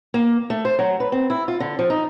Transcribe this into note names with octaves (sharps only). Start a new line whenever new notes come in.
A#3
A3
C5
F#3
B4
C4
E4
F4
D3
F3
D#4